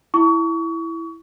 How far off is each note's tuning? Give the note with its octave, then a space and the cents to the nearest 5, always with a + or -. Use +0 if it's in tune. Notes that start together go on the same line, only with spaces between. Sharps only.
E4 +0 C#6 +30